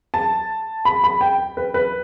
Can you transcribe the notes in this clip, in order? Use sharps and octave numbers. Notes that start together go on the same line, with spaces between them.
A5
B5
B5
G5
B4
B4